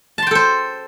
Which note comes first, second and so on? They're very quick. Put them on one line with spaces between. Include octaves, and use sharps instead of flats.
A5 C6 G5 A4 C5